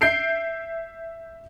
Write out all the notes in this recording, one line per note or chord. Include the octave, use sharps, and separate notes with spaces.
E5 G6 C7 D7